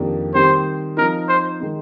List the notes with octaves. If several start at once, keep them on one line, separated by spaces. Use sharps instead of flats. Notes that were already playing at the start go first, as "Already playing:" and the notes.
Already playing: F2 D#3 A#3 D4 G4
D#3 G3 C4 G4 C5
F3 C4 D#4 A#4
C5
D#3 G#3 D#4